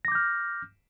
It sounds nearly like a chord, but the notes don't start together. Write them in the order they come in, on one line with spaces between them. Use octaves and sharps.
A#6 D6 G6 F6